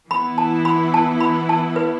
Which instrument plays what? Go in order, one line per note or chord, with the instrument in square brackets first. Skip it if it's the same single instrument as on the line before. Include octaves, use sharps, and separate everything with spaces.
[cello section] E3 B3 E4 [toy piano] B5
[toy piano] A5
B5
A5
B5
A5
B4